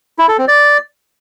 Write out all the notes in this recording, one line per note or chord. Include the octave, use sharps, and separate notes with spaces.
E4
A4
C4
D5